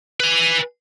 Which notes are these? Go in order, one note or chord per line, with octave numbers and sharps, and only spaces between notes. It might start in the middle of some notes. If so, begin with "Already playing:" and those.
B4 G#5